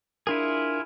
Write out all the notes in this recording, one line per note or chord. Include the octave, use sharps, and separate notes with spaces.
D4 E4 F4 G#4 A#4